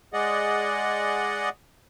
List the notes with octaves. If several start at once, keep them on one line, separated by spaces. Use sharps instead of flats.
G#3 G#4 D5 D#5 F#5